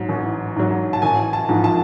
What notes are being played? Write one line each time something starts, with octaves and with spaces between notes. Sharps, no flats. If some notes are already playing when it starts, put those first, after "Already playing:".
Already playing: G#2 F#3
A1
G#2 F#3
A5
A1 G#5
A5
G#2 F3
A5